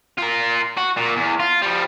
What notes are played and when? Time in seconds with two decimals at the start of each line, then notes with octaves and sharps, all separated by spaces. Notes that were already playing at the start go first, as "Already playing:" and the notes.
0.18 F4 A#4
0.78 F#4
0.97 A#2
1.16 E2
1.40 F4
1.62 F3 G3